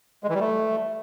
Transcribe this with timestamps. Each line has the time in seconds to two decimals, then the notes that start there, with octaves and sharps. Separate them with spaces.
0.24 G#3
0.29 E3
0.35 G3
0.40 A3